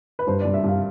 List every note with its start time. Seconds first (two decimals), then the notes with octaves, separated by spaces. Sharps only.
0.19 B4
0.27 G2 C5
0.41 G2 D5
0.54 E5
0.64 G2 F5